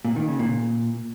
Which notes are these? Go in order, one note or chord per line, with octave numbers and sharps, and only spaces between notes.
A#2
D#3
C#3
A#2